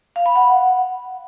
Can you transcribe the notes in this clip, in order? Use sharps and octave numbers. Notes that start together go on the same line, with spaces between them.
F5
B5
F#5